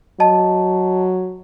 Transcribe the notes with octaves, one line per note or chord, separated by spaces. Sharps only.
F#3 D#5 A5